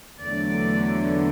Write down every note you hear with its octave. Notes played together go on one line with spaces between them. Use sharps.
E2 D3 F#3 A3 D5